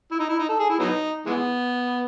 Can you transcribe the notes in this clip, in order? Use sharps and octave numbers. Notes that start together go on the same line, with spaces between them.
E4
D#4
E4
D#4
A4
G#4
E4
F#3 B3 D#4
E3 G#3 B3